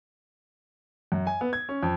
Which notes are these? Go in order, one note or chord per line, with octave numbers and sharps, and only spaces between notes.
F#2
G#5
B3
G#6
C#4
F2